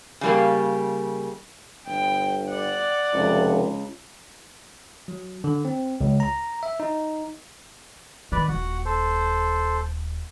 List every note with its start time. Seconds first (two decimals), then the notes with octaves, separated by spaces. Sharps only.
0.21 C#3 G3 A#3
1.87 G1 G5
2.49 D5 F#5
3.13 F1 C#2
5.08 F#3
5.44 D3
5.65 C4
6.01 C#2
6.20 A#5
6.63 E5
6.80 D#4
8.32 D#3 B4 D5
8.48 D#1 F#4 F#5
8.85 A4 C5